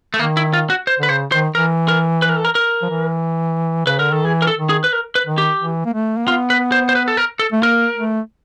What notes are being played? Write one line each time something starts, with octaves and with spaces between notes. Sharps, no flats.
A3
D#3 A#3
E4
F4
F#4
C5
D3 B4
C#3 C5
D#3 C5
E3 A#4
A#4
B4
A#4
A4
A#4
A#4
F3
E3
C#3 B4
D3 A#4
D#3 A4
E3 G#4
A#4
A4
D#3
G#4
B4
A#4
B4
D#3
G4
E3
A#3
A3
A#3
B3 F4
B4
C5
C5
B4
A4
A#4
A4
A3
A#3 A#4
A3